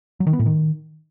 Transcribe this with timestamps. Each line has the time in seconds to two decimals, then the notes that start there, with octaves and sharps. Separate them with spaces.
0.20 F#3
0.27 D#3
0.33 B3
0.39 A2
0.46 D#3